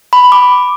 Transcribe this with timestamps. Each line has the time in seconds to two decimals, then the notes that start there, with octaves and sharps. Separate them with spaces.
0.13 B5
0.32 D6